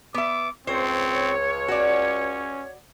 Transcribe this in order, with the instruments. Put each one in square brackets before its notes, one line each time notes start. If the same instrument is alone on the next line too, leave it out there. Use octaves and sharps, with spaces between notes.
[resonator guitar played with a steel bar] B3 E5 [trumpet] D6
[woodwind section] C#2 C#5 [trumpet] C4 [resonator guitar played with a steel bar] C5
[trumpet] C#4 [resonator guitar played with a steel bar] F#4 D5